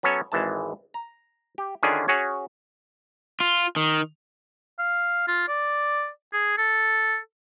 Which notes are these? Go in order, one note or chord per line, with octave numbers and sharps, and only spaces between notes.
F#3 B3 C#4 A4 C#5
G#1 E3 G#3 A5
A#5
G4
D3 D#3 C#4 D4 F4 G#4
C#4 F#4 G#4 C#5
F4
D#3
F5
F4
D5
G#4
A4